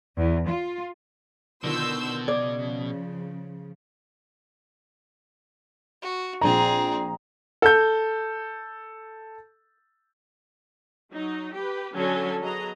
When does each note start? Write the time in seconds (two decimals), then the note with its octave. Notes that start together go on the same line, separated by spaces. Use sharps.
0.17 E2
0.48 F4
1.64 B2 D3 D#3 F3 C6 E6 G6
2.28 C#3 F3 D5 G#6
6.02 F#4
6.41 A#1 C4 G#4 A#5
7.62 A4 G6
11.11 F#3 D#4
11.53 G4 B4
11.93 D3 F#3 C#4 A4 G#5
12.40 F#3 B3 F#4 G#4 D#5 A#5